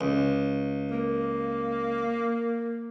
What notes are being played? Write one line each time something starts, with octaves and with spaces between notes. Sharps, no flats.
C#2
A#3